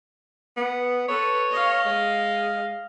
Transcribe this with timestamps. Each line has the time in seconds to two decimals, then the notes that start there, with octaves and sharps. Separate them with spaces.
0.57 B3
1.08 A4 B4 C#5
1.51 D#5 F5
1.86 G#3